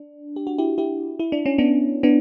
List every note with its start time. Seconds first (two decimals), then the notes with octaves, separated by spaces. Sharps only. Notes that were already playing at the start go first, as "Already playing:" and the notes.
Already playing: D4
0.36 G4
0.47 F#4
0.58 E4 G4
0.78 E4 G4
1.19 E4
1.32 D4
1.46 C#4
1.58 B3 D4
2.03 B3 D4